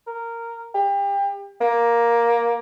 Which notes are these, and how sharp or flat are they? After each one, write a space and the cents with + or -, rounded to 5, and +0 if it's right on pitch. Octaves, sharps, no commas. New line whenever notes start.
A#4 -10
G4 +30
A#3 +10